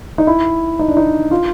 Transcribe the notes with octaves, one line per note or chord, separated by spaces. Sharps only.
D#4
E4
D#4
D4
D#4
F4